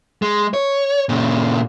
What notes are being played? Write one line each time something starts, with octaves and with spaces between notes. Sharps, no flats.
G#3
C#5
A#2 C#3